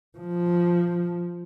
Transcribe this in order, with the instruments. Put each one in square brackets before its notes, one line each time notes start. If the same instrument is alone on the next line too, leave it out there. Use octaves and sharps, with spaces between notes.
[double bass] F3